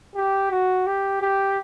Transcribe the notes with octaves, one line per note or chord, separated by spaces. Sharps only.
G4
F#4
G4
G4